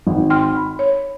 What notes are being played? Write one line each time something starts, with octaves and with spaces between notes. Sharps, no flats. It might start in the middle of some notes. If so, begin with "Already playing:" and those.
G#1
G5 C6 F6
B5
C#5